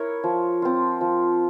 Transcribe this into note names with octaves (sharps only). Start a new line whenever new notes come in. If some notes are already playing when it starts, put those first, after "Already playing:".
Already playing: E4 A#4 C#5
F3
C4 F4
F3